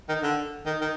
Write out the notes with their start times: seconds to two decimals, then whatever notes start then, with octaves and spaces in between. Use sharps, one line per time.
0.09 D#3
0.23 D3
0.66 D#3
0.81 D#3